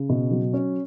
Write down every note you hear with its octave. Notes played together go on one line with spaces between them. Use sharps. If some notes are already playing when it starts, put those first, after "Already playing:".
Already playing: C#3
B2
F#3
C#4